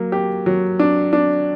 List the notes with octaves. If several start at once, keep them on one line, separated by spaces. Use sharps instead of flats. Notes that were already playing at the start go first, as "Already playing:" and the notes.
Already playing: F#3 A#3
G4
F#3
D4
D4